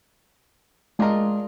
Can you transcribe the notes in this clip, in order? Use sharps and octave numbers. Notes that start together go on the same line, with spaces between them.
G#3 D4 F4 A#4 D#5